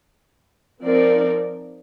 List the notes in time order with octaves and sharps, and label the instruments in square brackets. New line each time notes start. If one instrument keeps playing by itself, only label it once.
[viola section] F3 C4 D#4 A#4 D5